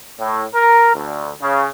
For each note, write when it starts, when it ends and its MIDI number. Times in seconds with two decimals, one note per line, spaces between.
0.19 0.43 45
0.54 0.94 70
0.95 1.33 38
1.41 1.67 49